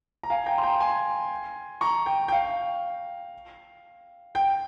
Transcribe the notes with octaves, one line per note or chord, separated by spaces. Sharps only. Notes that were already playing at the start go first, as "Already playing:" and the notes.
A#5
F5 G#5
G5 A#5
C6
G5 A#5
G#5 C6
A#5 C#6
G5
G5
F5
G5